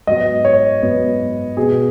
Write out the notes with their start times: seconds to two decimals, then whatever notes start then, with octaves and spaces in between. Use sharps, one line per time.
0.07 G#2 F#3 B3 D#5
0.45 C#5
0.82 G#2 F#3 B3
1.57 B2 B3 G#4